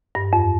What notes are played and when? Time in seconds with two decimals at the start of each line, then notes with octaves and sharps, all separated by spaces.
0.15 G2
0.33 F2